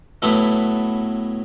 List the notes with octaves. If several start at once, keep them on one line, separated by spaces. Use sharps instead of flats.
A2 F#3 B3 E4 A4